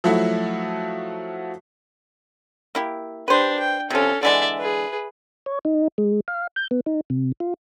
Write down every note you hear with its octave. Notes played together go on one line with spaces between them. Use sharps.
F3 F#3 A3 E4 F#4
A#3 E4 G4
D4 G4 B4 C5
G5
C3 F3 C#4 A4
D3 E3 G#3 D5 E5
G#4 B4
C#5
D#4
G#3
F5
G6
B3
D#4
C3
F4